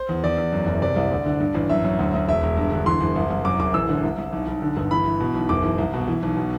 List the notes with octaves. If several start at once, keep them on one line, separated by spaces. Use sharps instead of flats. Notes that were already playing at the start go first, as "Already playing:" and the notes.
Already playing: C5
E2
E2 D5
E2
F#2
F#1
C3 D5
C2
D2
D3
G2
A1
F#2 E5
F#2
D2
D2
E1 E5
E1
G2
D3
E3 C6
F#1
C2
C2
F#2 D6
F#1 D6
A1 E6
D3
C2
C2
B1
B1
D3
G1
E3 B5
E3
B2
B1
F#1 D6
E3
C2
B2
E3
B1
B2